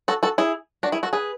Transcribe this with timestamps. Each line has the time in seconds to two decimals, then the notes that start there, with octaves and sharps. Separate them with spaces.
0.08 F#4 A4
0.23 F#4 A4
0.38 E4 G#4
0.83 D4 F#4
0.92 E4 G#4
1.03 F#4 A4
1.13 G#4 B4